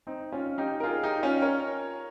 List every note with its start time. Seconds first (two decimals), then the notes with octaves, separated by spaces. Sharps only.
0.07 C4 D#4
0.32 C#4 F4
0.58 D#4 G4
0.80 A#4
0.84 F4 G#4
1.03 D#4 G4
1.23 C#4 F4
1.42 A#4 C#5